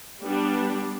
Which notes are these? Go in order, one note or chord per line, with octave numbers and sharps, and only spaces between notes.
G3 B3 D4